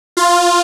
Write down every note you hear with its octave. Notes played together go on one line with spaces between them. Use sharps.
F4